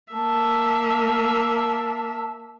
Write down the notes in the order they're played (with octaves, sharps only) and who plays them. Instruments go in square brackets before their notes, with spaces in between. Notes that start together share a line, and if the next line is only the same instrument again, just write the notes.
[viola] A#3 E5 [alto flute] A5